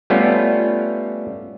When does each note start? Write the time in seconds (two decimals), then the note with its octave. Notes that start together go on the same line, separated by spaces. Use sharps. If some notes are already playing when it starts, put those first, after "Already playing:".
0.10 G3 A3 B3 C#4 F4